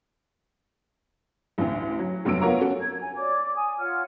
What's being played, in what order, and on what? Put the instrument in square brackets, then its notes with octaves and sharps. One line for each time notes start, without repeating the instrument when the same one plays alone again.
[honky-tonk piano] A1 D2
F#3
F1 G2 F#3 E6 D7
B3 F4 A#4 C#5 A#5
C#4 F#4 A4
[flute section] G#6
G#5
C#5 D5 D6
G#5 D#6
F4 C#5 F#5 F6